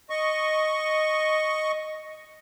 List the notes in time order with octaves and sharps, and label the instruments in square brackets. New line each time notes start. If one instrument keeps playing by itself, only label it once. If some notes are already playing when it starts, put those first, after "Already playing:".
[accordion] D#5 C#6